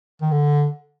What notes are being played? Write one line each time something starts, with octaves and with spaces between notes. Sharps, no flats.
D#3
D3